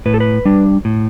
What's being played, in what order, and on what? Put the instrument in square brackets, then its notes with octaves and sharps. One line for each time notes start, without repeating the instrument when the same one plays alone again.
[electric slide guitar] A2 B4
A4
B4
G3 D4
A2